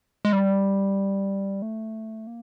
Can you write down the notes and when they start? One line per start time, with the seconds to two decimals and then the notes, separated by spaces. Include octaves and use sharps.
0.25 G#3
0.33 G3
1.62 A3
2.27 A#3